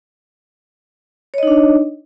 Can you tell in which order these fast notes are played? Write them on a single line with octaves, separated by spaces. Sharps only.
C#5 D#5 D#4 D4